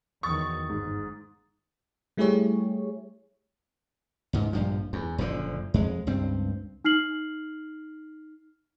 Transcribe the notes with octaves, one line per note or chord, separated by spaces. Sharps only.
E2 D#3 F#3 C#6 D#6 A6
G1 G#2
G3 A3 E4 G4 G#4 C#5
C#2 G#2
A#1 G2 F3
E2
F#1 A#2 D3 F3
F2 G#3
C#2 G2 C4
D#4 F6 C7 F#7